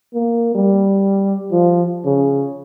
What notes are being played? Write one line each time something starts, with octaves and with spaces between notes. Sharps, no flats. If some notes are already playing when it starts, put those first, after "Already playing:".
A#3
G3
F3
C#3